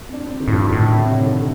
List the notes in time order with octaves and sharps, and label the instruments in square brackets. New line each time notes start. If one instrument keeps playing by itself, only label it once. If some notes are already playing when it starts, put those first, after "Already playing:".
[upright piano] C4
D4
C4
D#3
[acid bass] A2
[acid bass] G2 [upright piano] F3
[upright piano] D3
D#3
[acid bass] A2
[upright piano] D3
C3
C3
D3
D#3